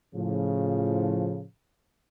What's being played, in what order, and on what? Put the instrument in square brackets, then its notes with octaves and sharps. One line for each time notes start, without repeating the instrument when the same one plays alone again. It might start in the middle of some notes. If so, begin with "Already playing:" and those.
[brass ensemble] A2 C#3 F3